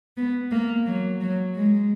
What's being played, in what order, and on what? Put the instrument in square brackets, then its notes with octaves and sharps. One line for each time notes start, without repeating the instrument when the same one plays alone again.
[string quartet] B3
A#3
F#3
F#3
G#3